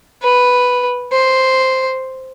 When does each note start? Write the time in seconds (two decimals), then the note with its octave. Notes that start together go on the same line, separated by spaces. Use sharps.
0.22 B4
1.12 C5